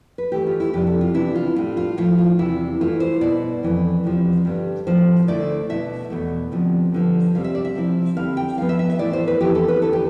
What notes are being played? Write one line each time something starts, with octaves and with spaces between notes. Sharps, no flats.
B4
G2 E3 A3 G4
F4
E4
F2 C3 G3 D4 G4
A4
F4
C3 E3 B3 D4 E4
F4
A2 G3 D4 F4
F4
A2 F3 A3 E4 F4
F4
E2 C3 G3 E4
G2 E3 A3 E4 F4
C5
B2 B3 E4 D5
F2 E3 A3
E2 C3 F3
G2 D3 G3 D4
A2 F3 C4 E4 C5
D2 D3 A3 E4 D5
B2 A3 E4 E5
E2 B2 A3
D2 C3 F3
G2 D3 F3
C3 G3 C4 F5
E5
D5
E5
C3 F3 C4 E4
D3 G3 C4 E4 F5
G5
G2 F3 B3 F5
E5
E5
E5
A2 E3 A3 E4 D5
C5
B4
F2 E3 B3 E4 G4
A4
B4
E2 D3 A3 A4
G4